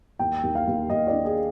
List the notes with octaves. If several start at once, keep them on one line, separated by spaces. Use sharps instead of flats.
D#2 G5
D#2
F5
D#2
D#2 D#5
D5
D4
G#4